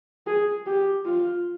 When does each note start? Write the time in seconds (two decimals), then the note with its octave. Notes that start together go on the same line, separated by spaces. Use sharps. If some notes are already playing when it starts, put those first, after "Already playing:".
0.27 G#4
0.66 G4
1.05 F4